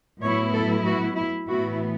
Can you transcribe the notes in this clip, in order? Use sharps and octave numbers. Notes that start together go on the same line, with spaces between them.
A2 F#3 B3 E4 C#5
A4
F#4
E4
A2 E3 B3 E4 F#4